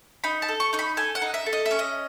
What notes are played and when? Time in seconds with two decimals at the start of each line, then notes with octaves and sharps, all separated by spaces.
0.24 D#4 B5
0.42 A5
0.48 A4
0.60 C#6
0.73 D#4 C#6
0.79 B5
0.97 A4 G#5
1.15 F#5
1.22 D#4
1.34 E5
1.46 A4
1.53 D#5
1.66 E5
1.71 C#4
1.79 D#5